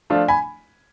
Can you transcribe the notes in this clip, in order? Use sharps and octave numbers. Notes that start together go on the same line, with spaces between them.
F3 A3 D4 F4
G#5 B5